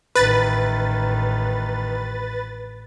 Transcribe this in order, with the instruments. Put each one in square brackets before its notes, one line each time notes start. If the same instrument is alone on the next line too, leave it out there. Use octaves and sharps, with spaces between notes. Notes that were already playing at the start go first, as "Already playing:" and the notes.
[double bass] A1 D#3 [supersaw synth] B4 A6